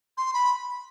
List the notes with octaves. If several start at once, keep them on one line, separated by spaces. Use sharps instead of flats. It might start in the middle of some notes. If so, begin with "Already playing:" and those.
C6
B5